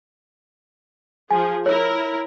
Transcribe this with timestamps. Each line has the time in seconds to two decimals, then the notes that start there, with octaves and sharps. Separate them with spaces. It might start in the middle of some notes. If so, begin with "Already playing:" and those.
1.31 F3 G#4 G#5
1.66 E4 A#4 C#5